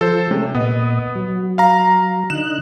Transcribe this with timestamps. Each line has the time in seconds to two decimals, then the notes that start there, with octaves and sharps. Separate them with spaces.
0.01 F3 A4 C5
0.31 C3 G#3 A3 C#4
0.55 A#2 B3 D#5
1.15 F#3
1.58 F5 A#5
2.30 D3 D#4 F#6 E7